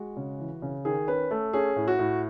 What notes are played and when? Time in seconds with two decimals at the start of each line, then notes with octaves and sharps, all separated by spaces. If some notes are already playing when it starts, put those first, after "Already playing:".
Already playing: G#3 F#4
0.16 C#3
0.39 E3
0.62 C#3
0.85 D#3 G#4
1.07 C#4 B4
1.31 A3
1.53 C#4 G#4
1.76 A2
1.87 F#4
1.99 A2